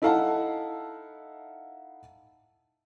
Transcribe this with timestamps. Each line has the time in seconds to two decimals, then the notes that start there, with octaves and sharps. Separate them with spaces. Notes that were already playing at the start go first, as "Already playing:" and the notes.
0.02 D#4 E4 A4 F5 F#5 A5